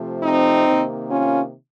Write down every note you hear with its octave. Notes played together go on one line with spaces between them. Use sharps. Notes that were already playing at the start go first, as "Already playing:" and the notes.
Already playing: C3 F3 A3
C4 D#4
C3 D#3 A#3
C#4 F4